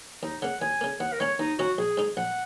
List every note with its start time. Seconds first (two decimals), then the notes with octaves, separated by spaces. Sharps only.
0.23 D#2 D#4
0.42 C#3 A#3 F#5
0.61 D#2 G#5
0.81 C#3 A#3
1.00 D#2 F#5
1.13 A#4
1.20 D#3 A#3 C#4 C#5
1.39 D#2 D#4
1.59 D#3 A#3 C#4 F#4
1.78 A#1 G#4
1.97 G#2 G#3 D#4
2.17 A#1 F#5